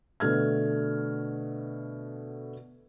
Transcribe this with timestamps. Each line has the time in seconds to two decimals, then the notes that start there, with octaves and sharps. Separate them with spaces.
0.20 B2 D3 A3 F6 G#6